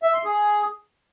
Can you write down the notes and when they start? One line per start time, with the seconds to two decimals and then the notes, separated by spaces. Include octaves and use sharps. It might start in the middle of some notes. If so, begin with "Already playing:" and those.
0.03 E5
0.14 C6
0.25 G#4